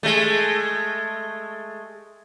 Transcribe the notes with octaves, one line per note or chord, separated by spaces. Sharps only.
G#3 A3